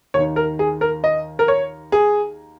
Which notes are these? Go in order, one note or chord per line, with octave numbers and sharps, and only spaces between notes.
D#2 D#3 C#5
A#4
G#4
A#4
D#5
A#4
C#5
G#4